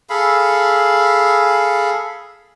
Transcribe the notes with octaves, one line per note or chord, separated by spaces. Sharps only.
G#4 A4 F5 B5